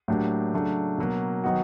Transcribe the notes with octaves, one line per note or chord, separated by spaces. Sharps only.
A2 F#3 A#3 D4 G4
C#3 F#3 A3 D4
B2 F#3 A#3
D#3 F#3 B3 D#4 F#4